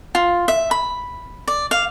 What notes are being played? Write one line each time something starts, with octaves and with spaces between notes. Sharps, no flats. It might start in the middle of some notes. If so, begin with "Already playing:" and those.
F4
E5
B5
D5
F5